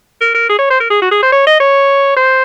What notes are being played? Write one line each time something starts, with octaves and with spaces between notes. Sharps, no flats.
A#4
A#4
G#4
C#5
C5
A#4
G#4
F#4
G#4
C5
C#5
D#5
C#5
C5